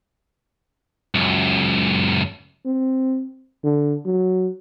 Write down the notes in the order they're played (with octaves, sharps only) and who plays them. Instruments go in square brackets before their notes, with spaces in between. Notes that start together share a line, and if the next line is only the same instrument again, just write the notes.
[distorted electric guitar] C#2 F#2
[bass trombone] C4
D3
F#3